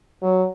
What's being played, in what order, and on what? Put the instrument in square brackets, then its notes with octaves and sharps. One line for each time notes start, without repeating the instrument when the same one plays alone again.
[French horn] F#3